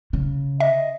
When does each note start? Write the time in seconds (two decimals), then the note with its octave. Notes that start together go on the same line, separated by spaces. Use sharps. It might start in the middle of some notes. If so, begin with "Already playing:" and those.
0.13 C#3
0.60 D#5 E5